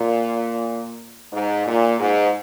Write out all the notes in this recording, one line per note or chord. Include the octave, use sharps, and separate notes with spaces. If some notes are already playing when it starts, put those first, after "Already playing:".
Already playing: A#2
G#2
A#2
G#2